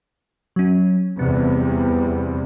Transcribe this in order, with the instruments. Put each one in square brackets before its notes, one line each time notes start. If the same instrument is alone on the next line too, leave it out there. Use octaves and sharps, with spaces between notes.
[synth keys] F#3 C#4
[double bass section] E2 C3 G3 [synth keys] B3